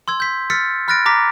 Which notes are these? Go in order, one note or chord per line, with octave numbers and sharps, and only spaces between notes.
C6 E6 G#6
G6 B6
E6 F6 A6 B6 C#7
B5 F6 F#6 A6 A#6 D7
A#5 D6 A#6 B6